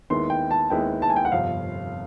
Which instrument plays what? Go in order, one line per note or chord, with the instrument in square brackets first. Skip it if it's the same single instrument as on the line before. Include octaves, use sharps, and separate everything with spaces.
[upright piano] D#2 D#3 G#3 B3 E4 [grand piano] C6
[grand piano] G5
A5
[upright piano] D#2 D#3 G#3 B3 E4 [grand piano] G5
[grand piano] A5
G#5
G5
F#5
[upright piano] G1 F2 C3 [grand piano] F5